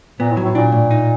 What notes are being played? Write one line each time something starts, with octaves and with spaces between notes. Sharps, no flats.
A#2 B3
A2
F#3
A2
A#2 D4
A2
D#4